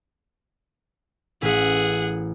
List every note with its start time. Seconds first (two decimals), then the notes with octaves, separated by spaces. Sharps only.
1.42 A1 G#4 F#5 E6 B6